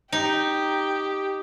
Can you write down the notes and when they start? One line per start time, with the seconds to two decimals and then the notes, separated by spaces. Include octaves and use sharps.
0.12 D#4 G4